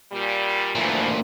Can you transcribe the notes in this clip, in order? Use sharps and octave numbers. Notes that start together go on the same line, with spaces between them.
A#2 G3
D2 A#2 E3 F3